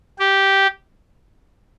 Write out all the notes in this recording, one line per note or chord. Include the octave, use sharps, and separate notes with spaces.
G4